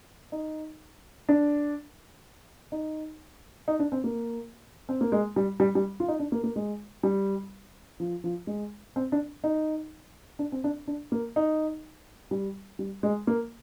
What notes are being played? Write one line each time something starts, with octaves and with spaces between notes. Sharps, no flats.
D#4
D4
D#4
D#4
D4
C4
A#3
C4
A#3
G#3
G3
G3
G3
F4
D#4
D4
A#3
A#3
G#3
G3
F3
F3
G#3
C4
D4
D#4
D4
C4
D4
D4
A#3
D#4
G3
G3
G#3
A#3